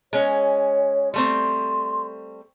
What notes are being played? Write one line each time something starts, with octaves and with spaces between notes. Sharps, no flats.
G#3 C#4 C#5
G3 A3 C4 C6